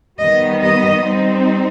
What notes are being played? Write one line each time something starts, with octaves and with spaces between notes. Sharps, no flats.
D#3 G3 B3 D#5
D#5
G3 C4 D#4